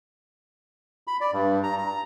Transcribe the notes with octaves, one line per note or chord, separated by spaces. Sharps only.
B5
D5
G2
A#5
A#5